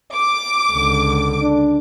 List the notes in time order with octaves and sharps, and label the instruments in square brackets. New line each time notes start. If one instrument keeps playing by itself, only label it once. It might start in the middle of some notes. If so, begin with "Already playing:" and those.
[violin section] D6
[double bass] C#2 D3
[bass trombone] D4